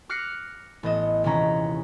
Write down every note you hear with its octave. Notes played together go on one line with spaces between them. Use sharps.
D6 F6 F#6 A#6 C7 C#7
A1 B3 D#5 E7
D#1 C3 E3 C#4 A#5 B6